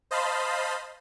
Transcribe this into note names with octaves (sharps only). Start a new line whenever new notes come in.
C5 D#5 F5 A5 B5 C6